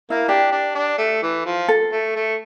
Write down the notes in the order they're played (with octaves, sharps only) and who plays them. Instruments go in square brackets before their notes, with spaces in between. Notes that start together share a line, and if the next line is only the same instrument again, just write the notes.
[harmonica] A#3 [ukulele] E4
[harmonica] D4 [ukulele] G4
[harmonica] D4
D4
A3
E3
F3
[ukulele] A4
[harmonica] A3
A3